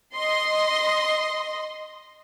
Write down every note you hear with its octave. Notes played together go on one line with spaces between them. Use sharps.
D#5 C6